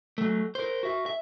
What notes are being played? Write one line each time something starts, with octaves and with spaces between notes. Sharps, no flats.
F#3 A3
A#4 C5
F#4 E5
E5